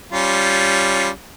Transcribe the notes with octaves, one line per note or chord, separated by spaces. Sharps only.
G3 C#4 F4